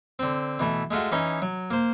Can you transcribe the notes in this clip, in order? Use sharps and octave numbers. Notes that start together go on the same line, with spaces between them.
D3 C4
B2 E3 A3
G#3 A3 F4 F#4
E3 C#4 D#4 D#5 D#6
F#3
A#3 C5